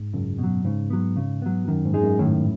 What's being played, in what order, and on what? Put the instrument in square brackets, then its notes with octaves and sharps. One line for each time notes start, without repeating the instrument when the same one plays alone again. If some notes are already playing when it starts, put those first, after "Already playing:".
Already playing: [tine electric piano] G#2
[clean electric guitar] C#2 [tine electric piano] F#2
[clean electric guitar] B2 F#3
[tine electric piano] G#2 [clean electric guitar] C#3
[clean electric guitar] F#3 B3
C#3
F#3 B3
[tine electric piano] F#2 [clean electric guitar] D#3
[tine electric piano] G#2
[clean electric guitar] G#3 D#4 G#4
[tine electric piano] F#2
[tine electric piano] A2 [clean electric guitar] D#3